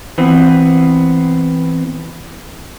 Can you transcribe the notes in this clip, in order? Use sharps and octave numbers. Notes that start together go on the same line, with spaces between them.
E3 B3 C4